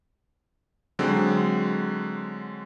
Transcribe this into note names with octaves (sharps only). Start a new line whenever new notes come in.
D3 F#3 G#3 C4